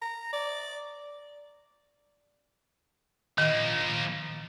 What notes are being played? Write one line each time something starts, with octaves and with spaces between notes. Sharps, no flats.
A#5
D5
D#3 F3 A#3